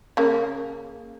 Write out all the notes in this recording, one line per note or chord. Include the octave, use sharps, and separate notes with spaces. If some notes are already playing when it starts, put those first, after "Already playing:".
C#3 A#3